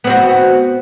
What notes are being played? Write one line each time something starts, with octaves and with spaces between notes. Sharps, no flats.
B3 C4 F#4